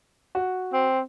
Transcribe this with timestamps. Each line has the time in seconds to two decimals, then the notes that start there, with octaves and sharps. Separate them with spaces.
0.35 F#4
0.73 C4